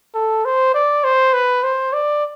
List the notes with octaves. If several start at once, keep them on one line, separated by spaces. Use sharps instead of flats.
A4
C5
D5
C5
B4
C5
D5